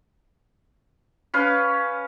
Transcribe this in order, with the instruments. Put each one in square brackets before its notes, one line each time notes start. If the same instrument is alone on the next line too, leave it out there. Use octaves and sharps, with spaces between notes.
[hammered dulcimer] C#4 B4 F5